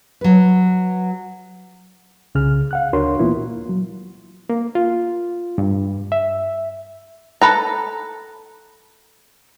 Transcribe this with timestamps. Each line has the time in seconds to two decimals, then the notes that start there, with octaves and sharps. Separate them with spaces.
0.21 F#3 B4
2.35 C2 C#3 G#4 F6
2.71 F5 F#5 F#6
2.93 D2 D4 F#4 A#4 C#5 C6
3.19 A#2 E3 A#3 B3 E4 F4
3.37 F#4
3.69 F#3
4.50 A#3
4.75 F4
5.58 G2
6.12 E5
7.41 A4 B4 A#5